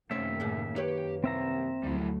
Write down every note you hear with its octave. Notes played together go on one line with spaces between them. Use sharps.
F#2 C3 D#3 A3 A#3 C4 C#4 E5
D#2 A2 C#3
G4 B4 C#5
C2 C4 E5 A#5
D2 F#3 G3 A3 E4